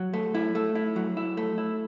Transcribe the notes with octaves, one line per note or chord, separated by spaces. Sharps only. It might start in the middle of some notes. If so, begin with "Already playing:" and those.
Already playing: F#3
A3
E4
A3
E4
F#3
E4
A3
E4